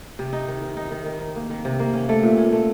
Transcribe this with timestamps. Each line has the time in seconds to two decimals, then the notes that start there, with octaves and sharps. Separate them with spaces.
0.19 C3
0.33 D#4
0.48 D#3
0.62 D#3
0.77 D#4
0.91 D#3
1.06 D#3
1.21 D#4
1.36 A#3
1.50 D#3
1.65 C3
1.79 A#3
1.94 C#4
2.09 A3
2.23 A#2
2.37 C#4
2.52 A3